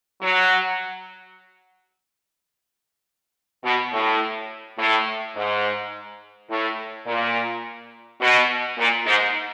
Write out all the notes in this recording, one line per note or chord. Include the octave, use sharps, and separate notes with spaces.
F#3
B2
A2
A2
G#2
A2
A#2
B2
A#2
G#2